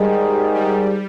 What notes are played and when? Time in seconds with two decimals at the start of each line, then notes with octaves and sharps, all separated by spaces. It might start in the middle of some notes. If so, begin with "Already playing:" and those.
Already playing: G#2 D#3 G3 G#3
0.54 G3